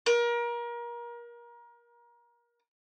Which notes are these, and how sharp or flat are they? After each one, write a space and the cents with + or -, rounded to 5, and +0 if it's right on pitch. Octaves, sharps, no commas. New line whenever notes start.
A#4 +30